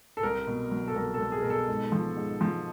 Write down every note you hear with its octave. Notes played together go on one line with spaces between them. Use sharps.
A4
C2 A#4
B2
F#3
A4
C2 A#4
A4
C2
G#4
B2 A#4
A4
G#2
F3
G#2
F3